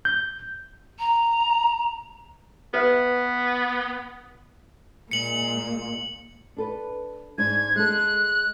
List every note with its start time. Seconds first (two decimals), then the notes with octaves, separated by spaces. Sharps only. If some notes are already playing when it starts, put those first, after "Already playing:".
0.05 G6
0.99 A#5
2.74 B3 B4 E5
5.11 A#2 G#3 C#7 F#7
6.57 D4 A4 B4
7.38 G#2 D4 G#6
7.76 G#3 A4 F#6